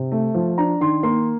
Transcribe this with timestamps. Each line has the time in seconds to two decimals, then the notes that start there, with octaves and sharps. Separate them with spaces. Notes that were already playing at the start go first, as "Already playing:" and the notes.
Already playing: C3
0.12 A3
0.34 F3
0.58 D4 A#5
0.81 D#3 C6
1.03 A#3 C6